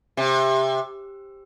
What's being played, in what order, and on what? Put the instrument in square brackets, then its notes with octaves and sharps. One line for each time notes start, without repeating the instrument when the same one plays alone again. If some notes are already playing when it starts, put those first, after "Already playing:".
[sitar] C3